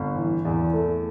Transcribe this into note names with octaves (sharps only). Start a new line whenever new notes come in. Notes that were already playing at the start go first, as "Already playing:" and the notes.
Already playing: G1
E3
E2
A3